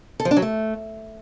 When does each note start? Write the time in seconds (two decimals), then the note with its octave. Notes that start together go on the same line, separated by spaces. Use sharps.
0.20 A4
0.25 F3
0.31 D4
0.37 F#3
0.42 A3